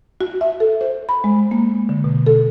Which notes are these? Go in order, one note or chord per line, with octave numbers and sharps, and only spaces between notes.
F#4
E5
A4
C5
B5
G#3
A#3
D3
B2
A4